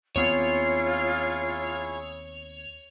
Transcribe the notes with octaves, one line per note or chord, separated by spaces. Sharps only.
D#2 B3 C4 E4 F4 G#4 C#5 C#6